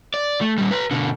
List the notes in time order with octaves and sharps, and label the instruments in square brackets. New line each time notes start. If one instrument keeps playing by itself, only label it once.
[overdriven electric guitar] D5
A3
A#2 G3
B4 A#5
B2 D3